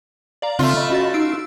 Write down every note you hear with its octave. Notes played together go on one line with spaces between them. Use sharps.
D5 F5 A#5
C#3 A3 C4 F4 C6
D#5 B5
C#4 F#4 A6
D#4 E6 C7 D7